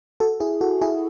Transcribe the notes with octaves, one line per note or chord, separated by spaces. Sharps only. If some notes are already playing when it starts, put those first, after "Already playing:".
F#4 A4
E4 G#4
F#4 A4
E4 G#4